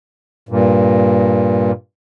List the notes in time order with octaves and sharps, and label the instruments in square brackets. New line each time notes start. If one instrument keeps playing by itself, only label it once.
[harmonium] G2 A#2